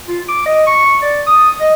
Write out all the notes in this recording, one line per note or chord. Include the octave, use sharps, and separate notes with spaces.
F4
D6
D#5
C#6
D5
D#6
D#5